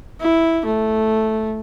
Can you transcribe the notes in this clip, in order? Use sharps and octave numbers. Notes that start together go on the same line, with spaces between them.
E4
A3